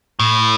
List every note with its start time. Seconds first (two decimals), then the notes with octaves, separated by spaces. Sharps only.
0.20 A2